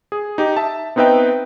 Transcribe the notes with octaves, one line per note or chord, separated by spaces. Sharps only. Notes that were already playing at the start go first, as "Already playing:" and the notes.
G#4
D#4 G4
E5 A5
B3 C4 D#4 B4 E5 G5